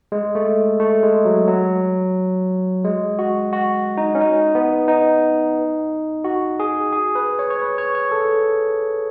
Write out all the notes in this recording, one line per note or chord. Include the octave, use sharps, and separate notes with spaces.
G#3
A3
A3
G#3
F#3
F#3
G#3
F#4
F#4
D#4
C#4
D#4
B3
D#4
F#4
G#4
G#4
B4
C#5
C#5
B4
C#5
C#5
A4